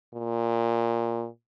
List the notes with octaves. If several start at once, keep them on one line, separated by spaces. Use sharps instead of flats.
A#2